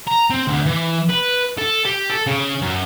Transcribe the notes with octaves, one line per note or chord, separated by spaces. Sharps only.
A#5
C4
D2
E3
B4
A4
G4
A4
C#3
F#2